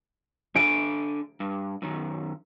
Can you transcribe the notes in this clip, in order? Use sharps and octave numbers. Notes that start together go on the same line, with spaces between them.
D4 A4 G#5 D7
G2
F#2 D#3